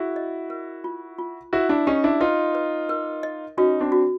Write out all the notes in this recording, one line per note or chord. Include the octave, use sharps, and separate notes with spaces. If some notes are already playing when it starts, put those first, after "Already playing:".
Already playing: E4 F#4 G#4
D#5
A#4
F4
F4
E4 F#4 B4
D4 E4
C#4 D#4 G4
D4 E4
D#4 F4 B4
B4
A#4
D#5
C#4 D#4 F#4
C4 D4
F#4